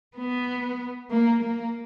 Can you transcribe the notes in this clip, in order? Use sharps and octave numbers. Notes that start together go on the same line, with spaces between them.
B3
A#3
A#3